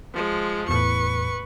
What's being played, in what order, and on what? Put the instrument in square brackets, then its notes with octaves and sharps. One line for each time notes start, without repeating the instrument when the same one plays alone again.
[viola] F3 G#3
[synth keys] E2 A2 [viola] B4 C#6